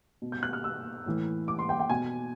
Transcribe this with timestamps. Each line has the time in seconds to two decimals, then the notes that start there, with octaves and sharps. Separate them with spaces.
0.22 B2
0.32 G6
0.43 F#6
0.53 F6
0.64 E6
1.06 A2 E3
1.48 D6
1.59 C6
1.69 G5
1.80 G5
1.90 B2 G#5